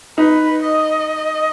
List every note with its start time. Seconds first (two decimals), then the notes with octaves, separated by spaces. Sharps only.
0.18 D#4 B4
0.61 D#5